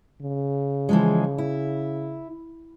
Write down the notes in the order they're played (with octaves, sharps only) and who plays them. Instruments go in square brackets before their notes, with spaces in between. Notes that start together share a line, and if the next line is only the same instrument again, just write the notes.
[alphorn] C#3
[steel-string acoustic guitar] E3 F3 G#3
E4